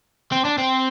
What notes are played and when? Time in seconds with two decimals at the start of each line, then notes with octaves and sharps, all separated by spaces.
0.32 C4
0.45 D4
0.58 C4